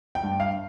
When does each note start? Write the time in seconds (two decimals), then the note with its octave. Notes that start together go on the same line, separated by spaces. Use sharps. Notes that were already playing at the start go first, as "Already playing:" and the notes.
0.15 G5
0.23 G2
0.40 F5